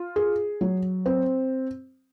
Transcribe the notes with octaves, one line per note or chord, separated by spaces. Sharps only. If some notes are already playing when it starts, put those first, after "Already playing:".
Already playing: F4
G#4
F#3
C4